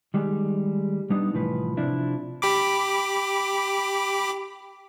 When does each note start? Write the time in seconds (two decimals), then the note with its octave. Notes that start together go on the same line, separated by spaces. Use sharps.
0.14 D#3 G3 G#3
1.10 G3 B3 D4 D#4
1.33 C2 A2 E3 F3 B4
1.77 C3 F3 C4 D4 E4
2.42 G4 B5 D6